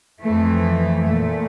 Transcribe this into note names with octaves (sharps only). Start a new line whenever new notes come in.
F2 E3 A3
A#2 A3